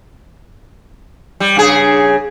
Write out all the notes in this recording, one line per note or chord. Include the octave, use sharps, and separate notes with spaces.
G3
G2 C#3 G#4